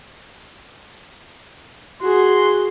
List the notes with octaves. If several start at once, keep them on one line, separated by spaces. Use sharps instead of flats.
F#4 G#4 C6